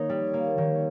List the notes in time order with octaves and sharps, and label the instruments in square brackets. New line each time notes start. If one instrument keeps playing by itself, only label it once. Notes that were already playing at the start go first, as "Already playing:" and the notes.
Already playing: [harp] D#3 A#3 D#4 [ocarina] C#5
[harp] G3
A#3
D#3